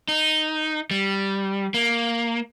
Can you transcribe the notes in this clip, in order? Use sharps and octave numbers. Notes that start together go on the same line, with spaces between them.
D#4
G3
A#3